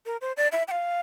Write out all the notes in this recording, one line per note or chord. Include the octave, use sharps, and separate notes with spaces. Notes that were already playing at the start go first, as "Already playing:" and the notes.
A#4
C5
D5
E5
G5
F5